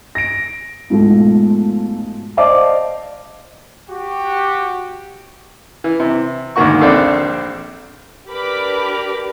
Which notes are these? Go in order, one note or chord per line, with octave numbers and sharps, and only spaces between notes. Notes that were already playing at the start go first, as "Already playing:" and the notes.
A#6 D7
G#2 B2 F3 G#3 A3
C5 D5 D#5 F5 A5 D6
F#4 G4
E3
C3
D2 G#2 D#3 A#3 F#4 C#6
A#1 C4 D4 A4 F5 E6
D4 G4 A#4 B4 B5 D6